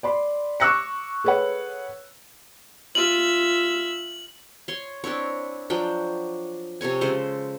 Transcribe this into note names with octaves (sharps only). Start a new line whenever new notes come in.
D5 B5 C6
C#6 D6 E6 F#6 A#6 C#7
G#4 A4 B4 C#5 F#5
F4 E5 F#7
C#5 C6
C4 D4 E4 C#5
F3 F#3 D4 G5
C3 A4 C#5 G#5
C#3 G#3 A4 C5